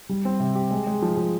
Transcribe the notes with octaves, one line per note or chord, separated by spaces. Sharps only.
G3
C4
C3
G4
G#3
G#3
F3
F3